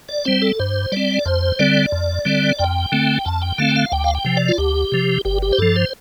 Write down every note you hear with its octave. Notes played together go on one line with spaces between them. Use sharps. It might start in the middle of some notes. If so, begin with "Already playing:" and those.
D5
G3 C4 C5
A4
G2 C5
G3 C4 D5
F2 C5
D3 G3 C4 D5
F2
D3 G3 C4
F2 G5
D3 A3 C4
F2 A5
G5
D3 A3 C4 F5
G5
F5
D2 G5
F5
G5
C3 F3
D5
F4
D2 G4
C3 F3
G1 G4
G4
C5
G2 F3 A4
C5